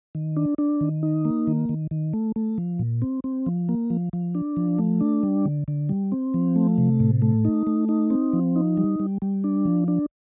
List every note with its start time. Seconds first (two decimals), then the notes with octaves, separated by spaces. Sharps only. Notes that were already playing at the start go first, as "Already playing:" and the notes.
0.15 D#3
0.37 D4
0.58 D4
0.81 D#3
1.03 D#4
1.25 A#3
1.47 D#3
1.69 D#3
1.91 D#3
2.13 A3
2.36 A3
2.58 F3
2.79 A#2
3.02 C4
3.24 C4
3.46 F3
3.69 A#3
3.90 F3
4.13 F3
4.35 D4
4.57 F3
4.79 A3
5.01 D4
5.23 G3
5.45 D3
5.68 D3
5.89 G3
6.12 C4
6.34 F3
6.56 A3
6.78 C3
7.00 A2
7.22 A3
7.45 D#4
7.67 A3
7.89 D#4
8.10 C4
8.33 F3
8.56 D#4
8.77 G3
9.00 G3
9.22 G3
9.44 D4
9.65 F3
9.88 D4